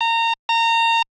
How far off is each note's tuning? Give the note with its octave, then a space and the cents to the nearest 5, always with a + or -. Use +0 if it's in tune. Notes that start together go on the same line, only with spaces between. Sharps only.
A#5 -25
A#5 -25